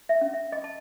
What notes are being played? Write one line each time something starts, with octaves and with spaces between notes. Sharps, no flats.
E5
C#4
E5
D#5
A5